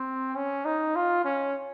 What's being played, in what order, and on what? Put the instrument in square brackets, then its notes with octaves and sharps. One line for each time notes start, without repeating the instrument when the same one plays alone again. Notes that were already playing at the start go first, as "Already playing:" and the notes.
Already playing: [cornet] C4
C#4
D#4
F4
C#4